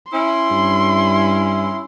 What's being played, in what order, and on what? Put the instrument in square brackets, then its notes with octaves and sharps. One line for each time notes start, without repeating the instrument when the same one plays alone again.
[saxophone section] C#4 E4 [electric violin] C6
[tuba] G2